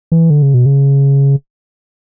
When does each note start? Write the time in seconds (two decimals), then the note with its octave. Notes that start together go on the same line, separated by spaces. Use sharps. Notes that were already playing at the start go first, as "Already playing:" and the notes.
0.12 E3
0.30 D3
0.42 C#3
0.54 B2
0.66 C#3